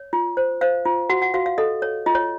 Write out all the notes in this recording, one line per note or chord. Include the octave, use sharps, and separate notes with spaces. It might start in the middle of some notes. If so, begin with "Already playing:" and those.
Already playing: C#5
F4
C5
C5 F5
F4
F#4 F#5
F#5
F#4 F5
F5
A4 D#5
C#5
F4 D#5
C#5